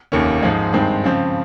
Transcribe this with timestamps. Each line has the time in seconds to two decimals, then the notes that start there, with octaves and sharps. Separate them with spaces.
0.12 F1 D#2 D#3 A#3 C#4
0.43 G#2 F3 G#3
0.73 G2 D#3 G#3 C4
1.04 C#3 F3 C4